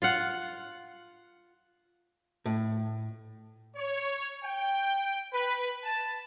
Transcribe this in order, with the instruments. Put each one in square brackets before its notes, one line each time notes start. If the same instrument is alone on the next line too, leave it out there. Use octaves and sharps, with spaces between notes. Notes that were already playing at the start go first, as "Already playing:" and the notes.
[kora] F4 F5 F#5
[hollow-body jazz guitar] A2
[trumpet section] C#5
G5
B4
A5